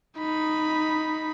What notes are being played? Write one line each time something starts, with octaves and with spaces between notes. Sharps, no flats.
D#4 B5